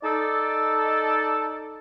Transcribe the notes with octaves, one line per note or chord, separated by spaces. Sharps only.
D#4 A4 D5